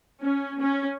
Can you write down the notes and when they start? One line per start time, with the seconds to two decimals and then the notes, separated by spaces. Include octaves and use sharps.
0.22 C#4
0.60 C#4